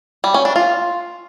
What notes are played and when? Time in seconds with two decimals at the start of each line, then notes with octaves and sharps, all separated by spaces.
0.24 G3
0.34 C#4
0.45 D4
0.56 F4